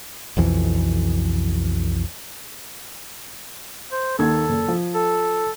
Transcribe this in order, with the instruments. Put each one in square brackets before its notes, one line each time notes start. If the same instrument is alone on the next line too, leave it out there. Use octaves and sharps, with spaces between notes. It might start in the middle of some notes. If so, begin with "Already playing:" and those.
[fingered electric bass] B1 F2 E3
[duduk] C5
[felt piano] D#2 D#3 G#6 [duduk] A4
[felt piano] F#1
F3
[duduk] A4